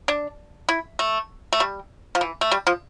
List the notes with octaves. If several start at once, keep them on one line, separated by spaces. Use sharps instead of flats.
D4
E4
A3
A3
G3
F3
E3
A3
G3
F3